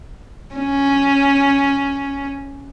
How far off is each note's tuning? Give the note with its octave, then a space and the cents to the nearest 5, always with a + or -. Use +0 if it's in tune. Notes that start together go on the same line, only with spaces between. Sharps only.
C#4 +0